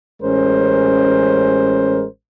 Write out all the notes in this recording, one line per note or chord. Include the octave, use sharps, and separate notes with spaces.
A1 G#3 C#4 A#4 C5